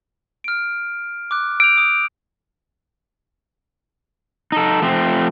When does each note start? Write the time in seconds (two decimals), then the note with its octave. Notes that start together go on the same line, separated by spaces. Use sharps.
0.44 F6 D7
1.31 D6 F#6
1.60 E6 G6 D7 F7
1.77 D#6
4.52 D#4 A4
4.82 F3 A3 C4